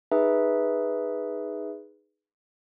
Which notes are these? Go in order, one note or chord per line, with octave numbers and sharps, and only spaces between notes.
D#4 G#4 B4 E5